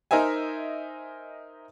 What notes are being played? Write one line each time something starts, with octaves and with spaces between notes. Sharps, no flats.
D#4 A#4 C5 D#5 E5 G#5